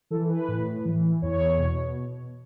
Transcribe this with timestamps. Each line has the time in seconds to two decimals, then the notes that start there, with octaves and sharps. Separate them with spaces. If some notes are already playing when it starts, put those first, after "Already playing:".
0.11 E3 A4
0.29 B4
0.48 A2
0.85 E3
1.22 E2 C#5
1.58 B2